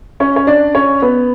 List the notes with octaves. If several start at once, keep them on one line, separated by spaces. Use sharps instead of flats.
C#4 C#5
C#5
D4 D5
C#4 C#5
B3 B4